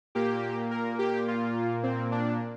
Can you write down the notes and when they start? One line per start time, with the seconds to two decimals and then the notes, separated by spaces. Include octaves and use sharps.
0.15 A#2 A#3 G4
0.71 A#4
0.99 G4
1.28 F4
1.83 C4
2.12 D4